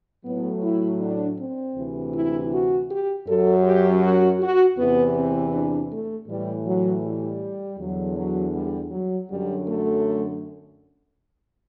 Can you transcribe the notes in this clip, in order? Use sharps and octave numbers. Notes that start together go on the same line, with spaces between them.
A2 F#3 B3
E4
D4
C4
D2 C3 E3
E4
F#4
G4
F#2 F#3 A4
G4
F#4
F#4
E2 C3 E3 B3
C4
D4
A3
A2 E3 G3
F#3
G3
E2 D3 F#3
F#3
G3
F#3
F#2 D3 F#3 G3
A3